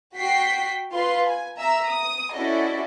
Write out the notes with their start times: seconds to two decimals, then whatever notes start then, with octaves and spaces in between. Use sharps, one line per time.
0.17 F#4 G5 B6 C7
0.94 F4 B4 C6
1.27 G#5
1.59 E5 A#5 E6
1.87 D#6
2.35 C#4 E4 F#4 A4 D5 D#5